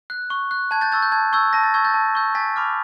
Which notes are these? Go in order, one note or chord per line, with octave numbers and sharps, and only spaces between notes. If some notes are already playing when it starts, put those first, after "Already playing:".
F#6
C#6
F#6
A5 G#6
G6 A6
C#6 E6 G6 A6
G6
A5 G#6
C#6 E6 G6 G#6
A5 A#6
A6
C#6 E6 G6 G#6
G6 A6
A5
C#6 E6 G6
G#5 A6 B6
B5 D6 F6